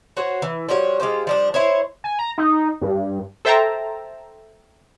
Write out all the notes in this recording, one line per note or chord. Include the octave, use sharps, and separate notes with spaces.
F#4 C5 C#5
E3
F3 G3 F#4 C#5
G#3 F4 G4 C5
F3 G3 D4
E4 C5 C#5
G#5
A#5
D#4
G2
A4 C5 E5 G5 A5 A#5